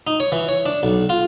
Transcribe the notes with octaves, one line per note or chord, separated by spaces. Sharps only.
D#4
C#5
E3
C#5
D4
B1
F4